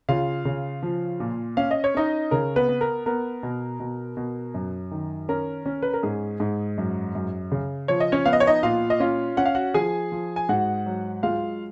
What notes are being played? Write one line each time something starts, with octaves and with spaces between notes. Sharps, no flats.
C#3 F4 F5
C#3
F3
A#2
C#4 F5
D#5
C#5
C#4 D#4 D#5
C#3 A#4
B3 B4
B3
A#4
B3 A#4
B2
B2
B2
F#2
D#3
C#4 A#4
C#4
B4
A#4
G#2 G#4
G#2
F#2
F#2
C#3
F3 C#5
D#5
C#4 C#5
B3 F5
D#5
C#5
D#4 D#5
A#2 F4 F5
D#5
C#4 F4 F5
C#4 F#5
F5
F#4 F#5
F3 G#4 G#5
F3
G#5
G#2 F#4 F#5
F#3
G#3 F4 F5